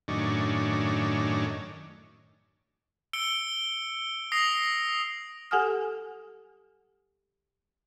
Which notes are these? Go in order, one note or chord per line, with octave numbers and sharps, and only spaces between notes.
F#2 A2 D#3 C#4 D4
E6 C#7 D7 G7
D#6 A#6 C7 F7
G4 A4 F#5 G#5 D#6 F6